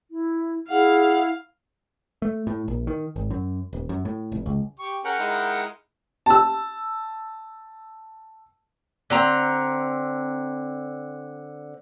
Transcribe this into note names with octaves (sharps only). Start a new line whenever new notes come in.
E4
E4 G#4 F5 F#5
A3
A2
A#1
D#3
G#1
F#2
D#1
F#2
A2
F1
C#2
G4 C#6
C#4 G#4 A#4 F#5 G5
G#3 D#4 E4
A5 E6
D3 C4 A#5